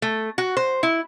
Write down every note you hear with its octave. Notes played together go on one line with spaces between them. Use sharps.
A3
F#4
C5
E4